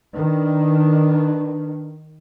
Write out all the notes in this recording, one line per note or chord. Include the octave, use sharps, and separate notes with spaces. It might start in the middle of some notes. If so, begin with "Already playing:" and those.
D#3 D4 B4